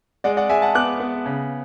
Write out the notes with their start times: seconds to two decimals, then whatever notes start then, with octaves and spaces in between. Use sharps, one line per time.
0.24 G#3 D5 F#5
0.37 D5 F#5
0.49 G#3 E5 G#5
0.62 F#5 A5
0.75 B3 D6 F#6
1.00 B3
1.26 C#3